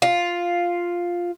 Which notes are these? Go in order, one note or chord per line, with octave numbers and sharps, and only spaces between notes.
F4